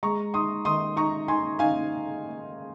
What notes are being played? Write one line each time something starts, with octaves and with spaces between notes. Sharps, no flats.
G#3 A#5 C#6
D#4 C6 D#6
D#3 C6 D#6
D#4 A#5 C#6
D#4 G#5 C6
D#4 F5 G#5